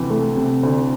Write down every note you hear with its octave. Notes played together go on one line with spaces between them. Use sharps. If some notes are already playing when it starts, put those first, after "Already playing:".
Already playing: D2 C3 E3
A3
C3
D2